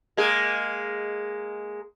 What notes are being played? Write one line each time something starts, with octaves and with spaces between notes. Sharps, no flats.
G#3 A#3 G#4